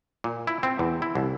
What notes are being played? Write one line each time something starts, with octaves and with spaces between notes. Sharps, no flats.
A#2
E4
C4
E2
E4
C2